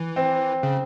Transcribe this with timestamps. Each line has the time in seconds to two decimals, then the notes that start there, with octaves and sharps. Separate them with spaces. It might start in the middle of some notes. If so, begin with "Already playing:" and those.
Already playing: E3
0.16 C4
0.63 C#3